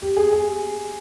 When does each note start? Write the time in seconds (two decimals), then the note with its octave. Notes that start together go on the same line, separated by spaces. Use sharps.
0.02 G4
0.16 G#4
0.32 G#4